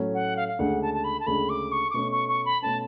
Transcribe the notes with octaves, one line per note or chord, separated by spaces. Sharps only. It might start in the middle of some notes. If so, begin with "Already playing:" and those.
Already playing: A2 F#3 A3 C#4
F#5
F5
F5
D2 C#3 G#3 D4 F#5
A5
A5
B5
A5
D2 C#3 G#3 D4 B5
D6
C#6
D6
B2 A3 C#4 C#6
C#6
C#6
B5
B2 A3 C#4 A5